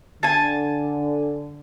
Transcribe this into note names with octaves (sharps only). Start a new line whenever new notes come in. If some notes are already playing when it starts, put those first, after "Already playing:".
D3 G#5 A5